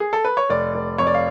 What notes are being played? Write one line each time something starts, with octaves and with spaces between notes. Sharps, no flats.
G#4
A4
B4
C#5
F1 D5
F1
F2 C#5
D5
F5